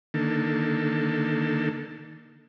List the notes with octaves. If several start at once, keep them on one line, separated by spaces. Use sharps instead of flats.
D3 D#3 A#3 A4